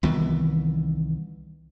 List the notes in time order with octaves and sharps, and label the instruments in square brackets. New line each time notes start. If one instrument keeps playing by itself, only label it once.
[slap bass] C2 D#3 E3 B3